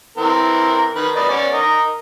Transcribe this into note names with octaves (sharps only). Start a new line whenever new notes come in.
E3 C4 A#4
D#3 B4
B4 D5 D#5
B3 C#4 D5
A#4 D#5